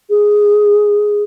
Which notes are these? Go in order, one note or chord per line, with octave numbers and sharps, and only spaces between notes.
G#4